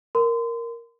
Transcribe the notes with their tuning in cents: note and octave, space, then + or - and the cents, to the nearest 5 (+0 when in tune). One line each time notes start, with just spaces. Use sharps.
A#4 +0 C6 -30